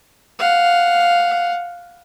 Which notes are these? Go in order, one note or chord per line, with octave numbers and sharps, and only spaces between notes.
F5 F#5